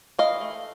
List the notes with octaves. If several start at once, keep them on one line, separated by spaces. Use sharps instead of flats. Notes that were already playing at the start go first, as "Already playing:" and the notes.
E3 D#5 F5
A3